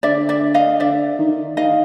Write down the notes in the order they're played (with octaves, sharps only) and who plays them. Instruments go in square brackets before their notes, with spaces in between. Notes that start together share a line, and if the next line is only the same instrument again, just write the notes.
[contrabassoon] D3 [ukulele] D5 E5
[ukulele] D5 E5
D#5 F5
[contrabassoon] D3 [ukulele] D5 E5
[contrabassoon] D#3
[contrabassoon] D#3 [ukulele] D#5 F5